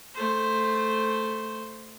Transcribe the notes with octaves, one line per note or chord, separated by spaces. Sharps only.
A3 C5